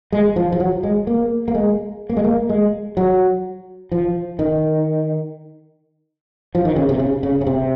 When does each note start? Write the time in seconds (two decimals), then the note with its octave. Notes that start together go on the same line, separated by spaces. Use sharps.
0.12 G#3
0.36 F3
0.52 F3
0.60 F#3
0.83 G#3
1.07 A#3
1.48 A#3
1.55 G#3
2.09 A#3
2.17 G#3
2.24 A#3
2.49 G#3
2.97 F#3
3.92 F3
4.39 D#3
6.55 F3
6.65 D#3
6.76 C#3
6.89 C3
6.99 C#3
7.23 C#3
7.41 C#3
7.47 C3